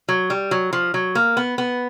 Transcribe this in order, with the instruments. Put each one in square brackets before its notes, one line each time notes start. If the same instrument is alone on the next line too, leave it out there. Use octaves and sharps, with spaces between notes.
[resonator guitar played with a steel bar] F#3
G3
F#3
F3
F#3
A#3
B3
B3